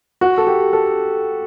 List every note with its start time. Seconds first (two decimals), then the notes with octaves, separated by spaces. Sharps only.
0.21 F#4
0.38 A4
0.47 G4
0.73 A4